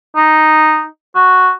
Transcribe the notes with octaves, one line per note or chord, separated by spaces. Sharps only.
D#4
F#4